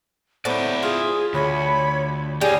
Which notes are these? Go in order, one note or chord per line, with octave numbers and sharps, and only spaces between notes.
A2 B3 E4 C5 D5
F4 G#4
D2 C#5 B5
G3 G#4 C#5 G5 G#5